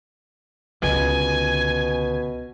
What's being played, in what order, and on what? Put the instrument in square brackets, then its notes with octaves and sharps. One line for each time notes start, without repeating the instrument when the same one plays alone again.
[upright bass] C#2 D3 [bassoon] B2 [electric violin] G#5